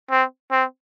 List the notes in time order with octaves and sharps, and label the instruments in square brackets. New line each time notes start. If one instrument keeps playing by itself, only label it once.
[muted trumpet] C4
C4